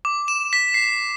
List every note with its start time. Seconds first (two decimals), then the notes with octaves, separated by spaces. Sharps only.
0.05 D6
0.28 E7
0.53 B6
0.74 C7